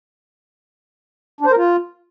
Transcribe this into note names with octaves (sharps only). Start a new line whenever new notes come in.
D4
C5
A#4
F4